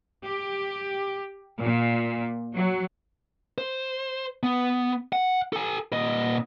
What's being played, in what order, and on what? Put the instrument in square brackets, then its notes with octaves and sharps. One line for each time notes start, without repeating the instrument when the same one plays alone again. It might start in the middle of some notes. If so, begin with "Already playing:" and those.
[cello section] G4
A#2
F#3
[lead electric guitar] C5
B3
F#5
A4 G#5
A#2 D#5